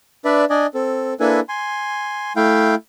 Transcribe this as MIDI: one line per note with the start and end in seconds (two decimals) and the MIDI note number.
0.25 0.45 62
0.25 0.45 71
0.25 0.45 74
0.25 0.45 76
0.50 0.66 62
0.50 0.66 74
0.50 0.66 75
0.50 0.66 80
0.74 1.14 60
0.74 1.14 69
1.20 1.40 58
1.20 1.40 62
1.20 1.40 64
1.20 1.40 69
1.20 1.40 71
1.20 1.40 80
1.49 2.33 80
1.49 2.33 84
2.36 2.75 57
2.36 2.75 64
2.36 2.75 77
2.36 2.75 79